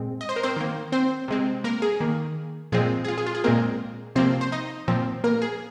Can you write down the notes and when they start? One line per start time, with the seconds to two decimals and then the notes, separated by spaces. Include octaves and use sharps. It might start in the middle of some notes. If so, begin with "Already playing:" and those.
Already playing: A#2 G#3 C4
0.21 D#5
0.29 C5
0.36 A#4
0.43 C4 C5
0.57 D#3 A#3
0.92 C4 C5
1.28 C3 G#3 C4
1.64 A#3 A#4
1.82 G#4
2.00 D#3 A#3
2.72 A#2 F3 G#3 C4 G#4
3.05 G#4
3.08 F4
3.18 G#4
3.26 F4
3.35 G#4
3.44 A#2 G#3 A#3 C4 A#4
4.15 C3 F3 A#3 C4 C5
4.41 C5
4.52 D#4 D#5
4.88 A#2 F3 C4
5.24 A#3 A#4
5.42 G#4